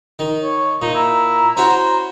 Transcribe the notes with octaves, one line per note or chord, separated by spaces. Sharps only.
D#3
C#5
A#2 D#4
E4 A#5
C#4 E4 F#4 C5